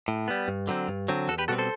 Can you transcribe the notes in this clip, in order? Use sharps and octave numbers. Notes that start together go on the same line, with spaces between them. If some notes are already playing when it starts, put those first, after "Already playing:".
A2
G3 B3
G2
D3 F#3 C4
G2
D3 F#3 C4
E2 F#4 A4
G4 B4
B2 G3 C4 F#4 A4
A4 C5